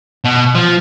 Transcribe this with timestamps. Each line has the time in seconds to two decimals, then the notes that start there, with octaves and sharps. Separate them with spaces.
0.25 B2
0.55 F3